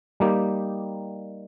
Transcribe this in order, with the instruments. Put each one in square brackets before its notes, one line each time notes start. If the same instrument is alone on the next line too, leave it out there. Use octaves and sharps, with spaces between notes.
[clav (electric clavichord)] G3 A#3 D#4 G4